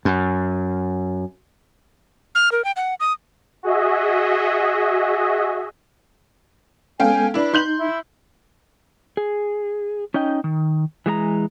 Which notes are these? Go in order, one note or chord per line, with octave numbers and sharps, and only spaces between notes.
F#2
F6
A#4
G5
F#5
D#6
F#4 G#4 D#5 E5
G#3 B3 C#4 A4 F5 G5 G#5
D4 E4 B4
D#4 C6 G6 F#7
E4
G#4
C#4 D#4 D#5 G5
D#3
E3 G#3 F4 A#5